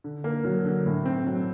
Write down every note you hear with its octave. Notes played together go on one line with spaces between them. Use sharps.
D3
A#3
F#3
D3
A2
C4
F#3